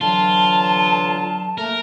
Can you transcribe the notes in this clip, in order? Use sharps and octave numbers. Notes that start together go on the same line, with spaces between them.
D3 E3 F#3 F4 A5
A3 A#3 A#4